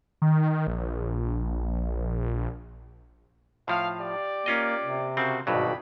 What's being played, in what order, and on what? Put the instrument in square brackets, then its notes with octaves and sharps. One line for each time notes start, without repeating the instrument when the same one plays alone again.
[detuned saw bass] D#3
A#1
[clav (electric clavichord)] A2 F3 [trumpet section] F5
[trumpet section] G4 D5
[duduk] A#3 [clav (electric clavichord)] C#4 F4 D#5
[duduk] C3
[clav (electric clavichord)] C#3 C4 [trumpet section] F#4 A#4 C5
[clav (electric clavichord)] G#1 G2 F#3 [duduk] B2 [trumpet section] D5 G5 B5